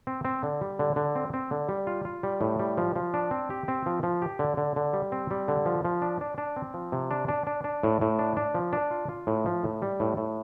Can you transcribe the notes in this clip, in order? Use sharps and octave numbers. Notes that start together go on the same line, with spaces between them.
C4
C4
D3
G3
D3
D3
C4
C4
D3
G3
F4
F4
G3
A2
G3
F3
F3
D4
C4
G4
C4
F3
F3
G4
D3
D3
D3
G3
C4
G3
D3
F3
F3
D4
D4
D4
C4
F3
C3
D4
D4
D4
D4
A2
A2
D4
D4
F3
D4
F4
F4
A2
F3
A2
G3
A2
A2